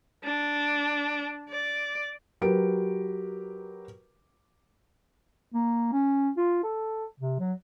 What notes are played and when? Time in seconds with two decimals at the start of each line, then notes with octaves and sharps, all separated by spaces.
0.24 D4
1.49 D5
2.41 F#3 G4 A#4 B4 D7
5.54 A#3
5.92 C#4
6.37 F4
6.63 A4
7.20 C3
7.39 F#3